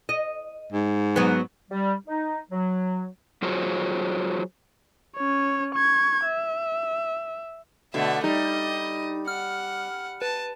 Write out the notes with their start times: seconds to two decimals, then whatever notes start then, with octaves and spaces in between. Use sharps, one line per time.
0.09 D#5
0.73 G#2
1.16 F#3 B3
1.71 G3
2.08 D#4
2.52 F#3
3.42 F#3 F4 F#4 G#4 C5 C#5
5.16 C#4 C#5
5.75 C#6 G#6
6.25 E5
7.94 B2 D3 A3 E5
8.24 G3 D#4 D#5
9.28 F#5 F6
10.22 B4 A5